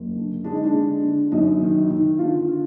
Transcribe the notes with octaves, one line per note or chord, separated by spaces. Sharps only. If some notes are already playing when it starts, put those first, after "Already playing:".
Already playing: F#1
D3
G#3 D4
D#4
D4
D3
D3
F#2 D#4
D#3
D#3
D3 F4